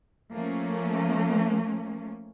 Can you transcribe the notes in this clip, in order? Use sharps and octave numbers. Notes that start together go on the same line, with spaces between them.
F3 A3 A#3 C#4